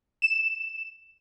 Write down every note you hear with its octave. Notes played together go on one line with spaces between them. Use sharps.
E7